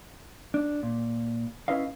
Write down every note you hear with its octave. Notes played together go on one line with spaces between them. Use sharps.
D4
A#2
C#4 E4 B4 D#5 F5